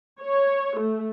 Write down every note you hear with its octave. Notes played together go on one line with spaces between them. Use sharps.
C#5
A3